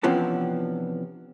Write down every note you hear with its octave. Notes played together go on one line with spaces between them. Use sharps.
C3 E3 F3 B3 C#4 D4